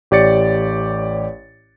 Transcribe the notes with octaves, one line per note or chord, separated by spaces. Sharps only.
A1 G4 C#5 D5 A6 C#7